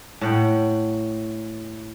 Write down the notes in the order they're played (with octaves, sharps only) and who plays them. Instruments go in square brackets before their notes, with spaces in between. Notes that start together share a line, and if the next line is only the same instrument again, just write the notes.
[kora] A2 F#5 G5